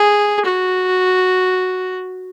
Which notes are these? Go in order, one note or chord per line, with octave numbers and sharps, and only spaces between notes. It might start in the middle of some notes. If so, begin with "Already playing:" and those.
Already playing: G#4
F#4